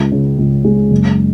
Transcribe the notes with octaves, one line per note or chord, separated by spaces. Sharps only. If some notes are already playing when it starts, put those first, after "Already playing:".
Already playing: C#2
C#3
C#2
G#3
F#1